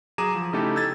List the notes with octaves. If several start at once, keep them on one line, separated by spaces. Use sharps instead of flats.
F#3 G#4 A#5 D6 D#7 E7
F3
C#3 A3 D#4 E4 G4 A4
E6 G#6 A6